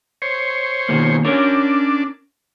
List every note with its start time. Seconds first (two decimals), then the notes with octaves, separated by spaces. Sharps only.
0.22 C5 C#5
0.89 B2 D#3 A#3
1.25 C#4 D4 A#4 C#5